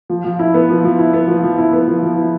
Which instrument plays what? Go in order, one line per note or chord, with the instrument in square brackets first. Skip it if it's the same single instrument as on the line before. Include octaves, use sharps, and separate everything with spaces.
[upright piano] F3
F3
E4
B3
F3
F3
E4
B3
F3
F3
E4
B3
F3
F3
E4